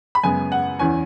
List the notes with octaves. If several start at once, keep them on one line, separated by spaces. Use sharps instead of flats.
B5
F#2 C#3 G#3 B3 G#5
F#5
E2 E3 C#4 G#5